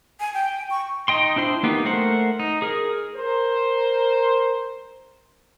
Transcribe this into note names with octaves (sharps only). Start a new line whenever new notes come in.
G#5
G5
C#6
D#4 D#5 G5 C6
D4 E4 C5 C6
A#3 B3 D#4 G4
A3 A#4 C5 F#5
D#4
G#4 A#4
A#4 C5